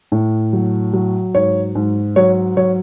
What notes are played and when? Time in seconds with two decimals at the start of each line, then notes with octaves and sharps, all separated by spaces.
0.12 A2
0.53 F#3
0.93 F#3
1.35 G#2 C#5
1.75 G#2
2.16 F#3 C#5
2.57 F#3 C#5